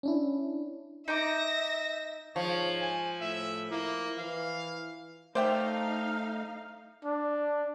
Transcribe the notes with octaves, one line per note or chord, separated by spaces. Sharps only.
C#4 D4 E4
D#4 E5 D6 A#6
G#2 F3 C#5
G#5
A2 E5
A#3 E4
E3 F5
A3 D#4 C5 D5 E5 F5 G5
D4